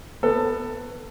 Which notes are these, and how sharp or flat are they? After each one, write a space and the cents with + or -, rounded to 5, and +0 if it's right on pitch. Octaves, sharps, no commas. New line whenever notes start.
B3 +0 A4 +20